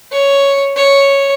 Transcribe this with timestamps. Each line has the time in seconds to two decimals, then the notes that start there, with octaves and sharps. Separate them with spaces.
0.12 C#5
0.76 C#5